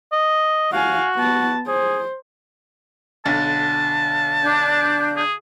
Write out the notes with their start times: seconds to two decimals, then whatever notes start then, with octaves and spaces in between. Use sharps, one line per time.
0.13 D#5
0.72 F#4 F5 G#5
1.15 B3 A5
1.67 G#4 C5
3.25 B1 D3 A5 A6
4.43 D4 G6
5.17 G#4